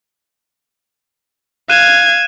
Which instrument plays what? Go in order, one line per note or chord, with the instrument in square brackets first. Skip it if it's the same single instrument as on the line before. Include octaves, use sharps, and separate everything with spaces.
[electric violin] F5 G#6 [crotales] F#6 D#7 E7